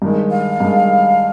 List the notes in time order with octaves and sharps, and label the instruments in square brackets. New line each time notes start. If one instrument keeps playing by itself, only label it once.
[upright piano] G2 D#3 G#3
[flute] F5
[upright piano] G2 D#3 G#3